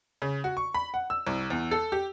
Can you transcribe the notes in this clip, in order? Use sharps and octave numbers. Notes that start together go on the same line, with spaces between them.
C#3
F#4
C#6
B5
F#5
E6
C2
E2
A4
G4